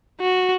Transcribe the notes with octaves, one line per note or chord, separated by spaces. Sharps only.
F#4